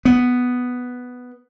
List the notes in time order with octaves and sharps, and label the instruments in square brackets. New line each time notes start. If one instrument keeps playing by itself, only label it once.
[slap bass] B3